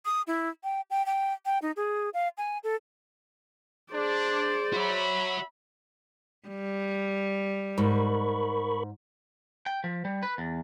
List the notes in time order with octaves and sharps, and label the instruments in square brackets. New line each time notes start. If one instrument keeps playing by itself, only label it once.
[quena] D#6
E4
G5
G5
G5
G5
D#4
G#4
F5
G#5
A4
[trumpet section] D4 [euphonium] G#4 [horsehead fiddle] C5 D5
[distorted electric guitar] F#4 C#5 [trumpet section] E5 B5
[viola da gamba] G3
[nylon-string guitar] G#2 [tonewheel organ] A#4 B5 C#6
[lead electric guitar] G5
F3
G3
B4
E2